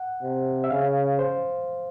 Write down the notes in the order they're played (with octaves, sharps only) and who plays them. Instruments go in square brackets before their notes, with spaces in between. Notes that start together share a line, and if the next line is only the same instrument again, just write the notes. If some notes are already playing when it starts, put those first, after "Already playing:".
Already playing: [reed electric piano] F#5
[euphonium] C3
[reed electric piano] E5
[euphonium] C#3 [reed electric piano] F5
[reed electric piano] C5